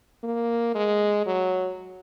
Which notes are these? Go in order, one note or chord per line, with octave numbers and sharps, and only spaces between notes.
A#3
G#3
F#3